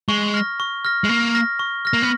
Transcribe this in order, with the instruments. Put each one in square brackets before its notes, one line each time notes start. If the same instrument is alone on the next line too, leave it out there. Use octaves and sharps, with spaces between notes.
[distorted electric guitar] G#3 [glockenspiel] C#6
[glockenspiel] F6 A#6
C#6
F6 A#6
[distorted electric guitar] G#3
[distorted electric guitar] A#3 [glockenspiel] C#6
[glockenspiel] F6 A#6
C#6
F6 A#6
[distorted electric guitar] A#3
B3